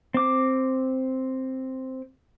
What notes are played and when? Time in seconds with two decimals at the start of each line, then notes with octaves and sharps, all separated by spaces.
0.14 C4 D6